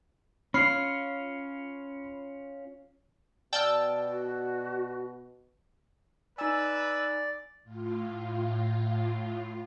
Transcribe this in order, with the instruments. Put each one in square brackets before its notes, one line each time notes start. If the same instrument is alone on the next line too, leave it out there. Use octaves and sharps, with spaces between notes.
[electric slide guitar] C#4 F4 [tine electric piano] B5 [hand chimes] F6 C7
[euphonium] B2 [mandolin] D5 F6 [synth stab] G5 A5 E6
[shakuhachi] F#4
[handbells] D#4 G#5 [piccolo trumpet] B4 [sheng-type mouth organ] D5 [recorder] E6
[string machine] A2 F4